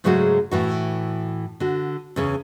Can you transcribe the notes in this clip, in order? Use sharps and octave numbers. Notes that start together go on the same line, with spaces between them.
G#2 C#3 F#3 G#3 A3 F#4
A2 E3 F#4
D3 F#4
E2 C#3 C#4